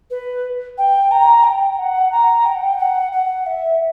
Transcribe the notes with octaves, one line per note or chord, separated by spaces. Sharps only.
B4
G5
A#5
G5
F#5
A#5
G5
F#5
G5
F#5
F#5
E5